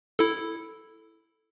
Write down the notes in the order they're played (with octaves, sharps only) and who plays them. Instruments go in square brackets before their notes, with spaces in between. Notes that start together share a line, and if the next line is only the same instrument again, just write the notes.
[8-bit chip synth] E4 A4